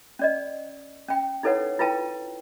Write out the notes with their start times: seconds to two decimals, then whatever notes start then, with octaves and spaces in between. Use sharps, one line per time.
0.19 C#4 D5 D#5
1.08 C#4 G5
1.43 D#4 E4 A4 B4 C#5 F#5
1.79 E4 F4 B4 G5 A5